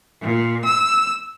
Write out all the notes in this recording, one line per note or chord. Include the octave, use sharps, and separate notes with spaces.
A#2
E6